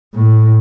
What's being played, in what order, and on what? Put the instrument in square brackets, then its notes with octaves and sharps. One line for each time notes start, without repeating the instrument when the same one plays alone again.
[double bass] A2